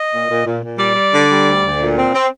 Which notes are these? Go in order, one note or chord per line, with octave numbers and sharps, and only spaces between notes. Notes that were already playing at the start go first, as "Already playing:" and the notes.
Already playing: D#5
A#2
A#2
A#2
A#2
G3 D5
G3
D3
G3
D2
D2
A#2
C4
C4